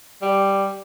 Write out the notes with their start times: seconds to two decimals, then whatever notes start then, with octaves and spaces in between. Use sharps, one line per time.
0.22 G3